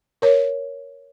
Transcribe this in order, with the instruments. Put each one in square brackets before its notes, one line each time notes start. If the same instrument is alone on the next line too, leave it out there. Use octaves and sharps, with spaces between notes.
[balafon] A#4 C#5